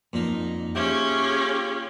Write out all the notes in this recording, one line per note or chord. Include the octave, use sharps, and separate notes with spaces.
F2 A#2 A#3 D#4
C#4 F4 G4 G#4 E5